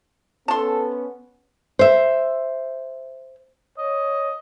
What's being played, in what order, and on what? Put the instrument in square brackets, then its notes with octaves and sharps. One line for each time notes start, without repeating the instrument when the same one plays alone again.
[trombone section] B3 C#4 [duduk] A4 [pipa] A5 C6
[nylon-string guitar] C5 E5
[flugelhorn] C#5 [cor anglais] D#5